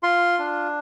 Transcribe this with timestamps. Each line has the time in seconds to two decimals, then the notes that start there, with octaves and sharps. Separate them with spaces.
0.03 F4 C6
0.39 D4